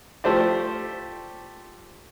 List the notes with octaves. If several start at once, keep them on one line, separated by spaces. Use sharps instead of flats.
F3 A3 G4 C5 D5